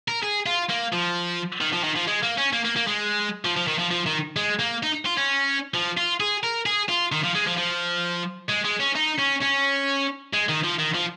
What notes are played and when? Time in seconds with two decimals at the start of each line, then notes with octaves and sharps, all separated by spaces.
0.08 A#4
0.23 G#4
0.46 F4
0.69 A#3
0.92 F3
1.61 D#3
1.73 F3
1.84 D#3
1.96 F3
2.07 G#3
2.23 A#3
2.38 C#4
2.53 A#3
2.65 A#3
2.76 A#3
2.87 G#3
3.45 F3
3.57 F3
3.68 D#3
3.79 F3
3.91 F3
4.06 D#3
4.36 G#3
4.59 A#3
4.83 D#4
5.05 F4
5.17 C#4
5.74 F3
5.97 F4
6.20 G#4
6.44 A#4
6.66 G#4
6.89 F4
7.12 D#3
7.24 F3
7.35 G#3
7.47 F3
7.58 F3
8.49 G#3
8.65 G#3
8.81 C#4
8.96 D#4
9.19 C#4
9.42 C#4
10.33 G#3
10.49 D#3
10.64 F3
10.79 D#3
10.95 F3